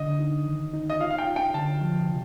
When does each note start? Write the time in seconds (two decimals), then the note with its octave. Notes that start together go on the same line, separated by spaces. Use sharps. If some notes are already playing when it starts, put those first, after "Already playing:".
Already playing: D3 D4 D#5
0.19 D#4
0.46 D#3
0.73 D#4
0.90 D#5
1.00 F4 F5
1.11 F5
1.18 G5
1.27 F4
1.36 G5
1.54 D3 A5
1.81 F3
2.09 C3